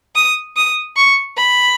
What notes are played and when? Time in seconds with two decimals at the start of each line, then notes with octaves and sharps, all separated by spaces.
0.15 D#6
0.57 D#6
0.96 C#6
1.37 B5